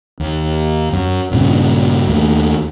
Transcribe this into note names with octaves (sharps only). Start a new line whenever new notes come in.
D#2
F#2
A#1 G2 A#2 C#3
D#2 D#3 A3